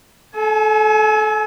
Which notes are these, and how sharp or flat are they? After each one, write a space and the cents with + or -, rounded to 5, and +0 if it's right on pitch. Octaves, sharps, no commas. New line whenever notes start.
A4 -25 G#5 +35